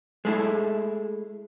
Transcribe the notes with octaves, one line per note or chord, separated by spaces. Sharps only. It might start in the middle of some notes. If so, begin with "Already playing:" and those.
G#3 A3 E4